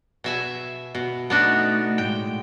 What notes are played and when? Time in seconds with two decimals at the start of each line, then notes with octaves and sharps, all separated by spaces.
0.24 B2 E5 G#5
0.95 B2
1.30 A3 B3 D4 D#4 F#4
1.98 A2 G#3 G5